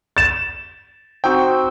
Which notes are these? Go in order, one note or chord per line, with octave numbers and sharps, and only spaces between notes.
A6 E7
C4 D#4 F#4 G5